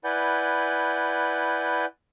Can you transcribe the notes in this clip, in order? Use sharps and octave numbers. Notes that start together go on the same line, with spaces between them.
E4 B4 D5 F#5 G#5 G6